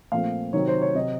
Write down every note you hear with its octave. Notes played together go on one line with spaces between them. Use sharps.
A#2 F3 A3 C4 F5
C3 D#3 F#3 C4 C#5
C5
C#5
C3 F#3 C4 D#5